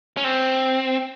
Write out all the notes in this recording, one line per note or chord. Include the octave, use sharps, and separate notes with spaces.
C#4
C4